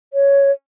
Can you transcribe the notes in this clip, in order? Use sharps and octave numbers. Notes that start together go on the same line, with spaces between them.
C#5